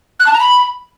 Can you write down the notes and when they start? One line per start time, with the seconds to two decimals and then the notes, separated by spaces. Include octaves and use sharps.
0.19 F#6
0.26 A5
0.33 A#5
0.40 B5